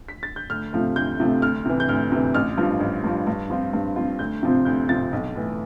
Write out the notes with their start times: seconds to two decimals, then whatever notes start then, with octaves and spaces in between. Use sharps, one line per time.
0.09 B6
0.23 A6
0.36 G6
0.50 D2 F6
0.73 C3 F3 A3
0.96 D2 G6
1.20 C3 F3 A3
1.42 D2 F6
1.65 C3 E3
1.80 G6
1.89 D2 F6
2.12 C3 E3
2.34 A1 F6
2.58 G2 F3
2.80 A1
3.04 G2 F3
3.27 G2
3.50 F3 C4 F4
3.73 G2
3.96 F3 C4 F4
4.19 D2 G6
4.43 C3 F3 C4
4.65 D2 G6
4.89 C3 F3 C4 A6
5.12 B1
5.35 A2 E3